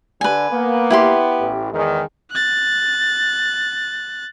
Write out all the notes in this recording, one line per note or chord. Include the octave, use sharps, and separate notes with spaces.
D3 B4 G#5
A#3 B3
E4 G4 C6
A1
E2 D#3 G#3
F#6 A6